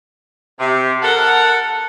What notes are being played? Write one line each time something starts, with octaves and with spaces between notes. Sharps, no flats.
C3
A4 A#4 F#5